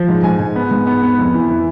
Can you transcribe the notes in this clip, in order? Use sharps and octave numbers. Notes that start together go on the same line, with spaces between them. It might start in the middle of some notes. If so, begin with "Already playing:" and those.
Already playing: F3
G#2
G#2 G#5
G#2
B3
G#2
B3
B3
F2
E3
E3